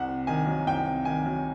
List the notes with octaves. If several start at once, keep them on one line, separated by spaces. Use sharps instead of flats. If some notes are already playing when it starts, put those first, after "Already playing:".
Already playing: C2 F#5
C3
D#3 G#5
F#3
C2 G5
C3
D#3 G#5
F#3